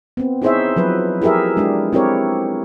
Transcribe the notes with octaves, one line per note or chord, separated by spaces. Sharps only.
B3 C4
D#4 E4 G#4 C5 C#5 E5
F3 F#3 B4
E4 G4 G#4 A#4 E5
G#3 D4 G4
C4 E4 G4 A#4 C#5